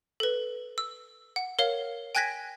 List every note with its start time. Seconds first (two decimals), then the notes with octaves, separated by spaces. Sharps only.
0.20 A4 B4
0.78 E6
1.36 F#5
1.59 A#4 C#5 F5
2.15 G5 G#5 F#6 G#6 A#6 B6